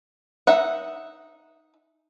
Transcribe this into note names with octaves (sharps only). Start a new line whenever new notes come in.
D#4 E5 F#5